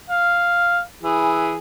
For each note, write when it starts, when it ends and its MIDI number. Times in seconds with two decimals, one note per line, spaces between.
0.09 0.81 77
1.03 1.56 52
1.03 1.56 68